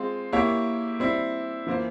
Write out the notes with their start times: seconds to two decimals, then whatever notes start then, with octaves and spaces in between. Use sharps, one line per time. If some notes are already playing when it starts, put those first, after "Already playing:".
Already playing: G#3 C4 F4
0.33 A#3 E4 G4 C#5
1.00 G3 C4 E4
1.67 E3 A#3 F4 C5